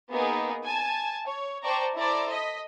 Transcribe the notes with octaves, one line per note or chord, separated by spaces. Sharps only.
A#3 B3 D#4 G#4 A#4 B4
G#5 A5
C#5
C5 D5 G5 A5 A#5 C#6
E4 A4 C5 D5 A#5
D#5 B6